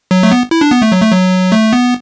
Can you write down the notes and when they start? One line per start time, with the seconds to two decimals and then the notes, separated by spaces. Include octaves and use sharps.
0.11 F#3
0.23 A3
0.31 B3
0.51 E4
0.61 D4
0.71 B3
0.82 A3
0.92 F#3
1.02 A3
1.12 F#3
1.52 A3
1.73 B3